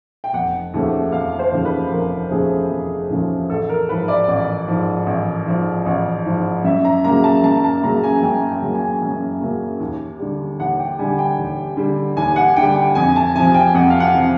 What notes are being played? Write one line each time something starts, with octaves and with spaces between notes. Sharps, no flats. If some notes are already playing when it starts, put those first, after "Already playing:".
G5
F1 F#5
D#2 C#3 F3 A3
F1 F5
C5
D#2 C#3 F3 A3
B4
F1 A#4
D#2 C#3 F3 A3 G#4
F1
D#2 C#3 F3 A3
A1 A4
A#4
G#2 F3 B4
D5
A1
G#2 F3
A1
G#2 F3
A1
G#2 F3
F#2 E5
A#5
C#3 F#3 A#3 A#5
A5
F#2 A5
A5
C#3 F#3 A#3 A#5
G#5
F#2 G5
G5
C#3 F#3 A#3
G#5
F#2
C#3 F#3 A#3
D#2
D3 G3
D#2 F#5
G5
D3 G3 G#5
G5
D#2
D3 G3
D#2 G#5
F#5
D3 G3 G5
G5
F2 G#5
A5
C3 F3 G#5
G5
F2 F#5
F5
F#5
C3 F3